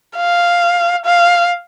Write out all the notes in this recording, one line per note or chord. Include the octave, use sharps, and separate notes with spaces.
F5
F5